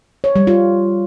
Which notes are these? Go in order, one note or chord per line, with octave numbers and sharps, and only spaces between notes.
C#5
G3
F4